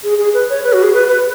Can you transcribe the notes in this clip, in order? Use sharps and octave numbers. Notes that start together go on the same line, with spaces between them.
G#4
G#4
B4
C#5
B4
F#4
G#4
B4
B4